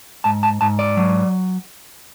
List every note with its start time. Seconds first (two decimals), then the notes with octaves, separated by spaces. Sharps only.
0.24 G#2 A5
0.43 A5
0.61 G#2 A5
0.79 D5
0.97 F#3